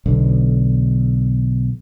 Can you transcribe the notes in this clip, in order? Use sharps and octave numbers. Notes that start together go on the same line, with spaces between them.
B1 D3